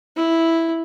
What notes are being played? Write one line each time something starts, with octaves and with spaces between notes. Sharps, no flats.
E4